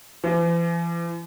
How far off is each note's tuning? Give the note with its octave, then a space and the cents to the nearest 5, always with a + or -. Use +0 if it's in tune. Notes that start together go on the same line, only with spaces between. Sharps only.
E3 +45